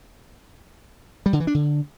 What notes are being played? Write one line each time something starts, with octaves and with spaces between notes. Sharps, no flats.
G3
D3
E3
D4
D3